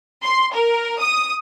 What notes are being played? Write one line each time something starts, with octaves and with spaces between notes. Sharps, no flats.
C6
A#4
D#6